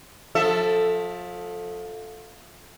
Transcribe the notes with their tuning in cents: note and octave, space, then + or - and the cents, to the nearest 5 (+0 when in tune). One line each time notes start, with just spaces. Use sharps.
F3 +30 A4 +0 E5 +0